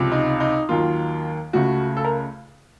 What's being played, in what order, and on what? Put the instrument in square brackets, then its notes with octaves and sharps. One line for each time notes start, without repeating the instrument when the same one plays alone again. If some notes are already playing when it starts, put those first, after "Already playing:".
Already playing: [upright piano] C#2 C3 F3
D#4
D#4
D#2 D#3 F#3 A#3 F4
C#2 C#3 A3 F#4
A4
A#4